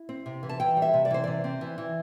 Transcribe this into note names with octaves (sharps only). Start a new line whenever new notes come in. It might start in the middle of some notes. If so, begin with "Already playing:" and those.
Already playing: E4
C4
C3
E3
A5
E3 G5
G3
E5
C3
D5
E3 C5
C3 D5
C4
E3
E3